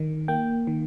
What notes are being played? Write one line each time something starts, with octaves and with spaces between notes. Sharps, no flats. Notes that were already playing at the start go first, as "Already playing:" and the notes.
Already playing: D#3
A#3 G5
D#3